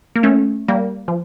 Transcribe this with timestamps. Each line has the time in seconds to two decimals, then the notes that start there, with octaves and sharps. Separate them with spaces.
0.16 A#3
0.23 A3 C#4
0.68 G3 A#3
1.08 F3